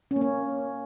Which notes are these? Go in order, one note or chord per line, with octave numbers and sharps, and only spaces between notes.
C#4
A#3
C#4